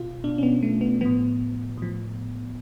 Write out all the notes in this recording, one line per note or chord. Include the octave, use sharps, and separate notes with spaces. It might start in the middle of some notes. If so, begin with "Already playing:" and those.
Already playing: B2 F4
B2 D4
C#4
B3
A3
B3
A2 F3 B3
A2 F3